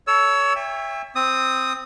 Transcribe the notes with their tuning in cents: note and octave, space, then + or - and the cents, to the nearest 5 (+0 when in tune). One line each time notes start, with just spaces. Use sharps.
A4 +0 C#5 +25 E6 +0
C#5 +0 E5 +0 G5 +40
C4 +0 D#6 +0